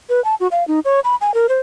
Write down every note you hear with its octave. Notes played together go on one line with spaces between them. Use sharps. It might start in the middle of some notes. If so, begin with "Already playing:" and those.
B4
A5
F#4
F5
D#4
C#5
B5
G#5
A#4
C5